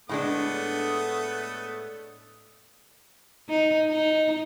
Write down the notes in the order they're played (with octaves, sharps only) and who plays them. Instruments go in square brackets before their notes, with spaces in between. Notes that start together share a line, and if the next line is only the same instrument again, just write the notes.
[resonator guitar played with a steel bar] A2 G#3 D4 [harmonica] A3 B3 D#6
[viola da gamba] D#4
D#4